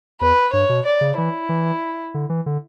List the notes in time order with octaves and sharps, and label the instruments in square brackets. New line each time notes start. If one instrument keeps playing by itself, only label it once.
[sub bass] E2 [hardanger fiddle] B4
[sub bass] G2 [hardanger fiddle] C#5
[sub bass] B2
[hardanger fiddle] D5
[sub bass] C#3
[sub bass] E3 [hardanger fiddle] E4
[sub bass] E3
D3
E3
D3